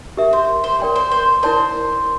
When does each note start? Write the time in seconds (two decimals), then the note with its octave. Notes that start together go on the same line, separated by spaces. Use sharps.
0.17 G4 A#4 E5
0.33 C5
0.64 C5
0.80 A#4 D5 G5 C6
0.96 C5
1.12 C5
1.43 E4 A#4 C5 D5 A5 C6